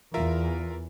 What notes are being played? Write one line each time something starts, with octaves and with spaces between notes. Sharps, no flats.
E2 F4 A#4 E5